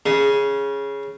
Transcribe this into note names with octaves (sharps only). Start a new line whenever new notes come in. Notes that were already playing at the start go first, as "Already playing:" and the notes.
C#3